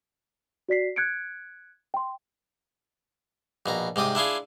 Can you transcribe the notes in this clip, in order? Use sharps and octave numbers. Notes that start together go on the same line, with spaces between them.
F#4 D5 B6 C7
F#6 G#6 C#7 D7
G5 C6
A#1 B2 A#5
G#2 C3 D5 D#6
D4 E4 F4 G#4